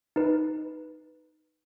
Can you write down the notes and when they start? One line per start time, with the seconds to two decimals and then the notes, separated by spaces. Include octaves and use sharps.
0.16 D#4 B4